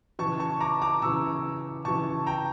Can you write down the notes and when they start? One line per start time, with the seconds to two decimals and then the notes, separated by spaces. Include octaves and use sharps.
0.19 C#3 E3 A5 C#6
0.40 A5 C#6
0.60 A#5 D6
0.82 A#5 D6
1.02 C#3 E3 C#6 E6
1.85 C#3 E3 A5 C#6
2.26 G5 A#5